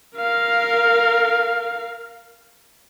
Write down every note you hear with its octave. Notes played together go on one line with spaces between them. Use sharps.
A#4 F5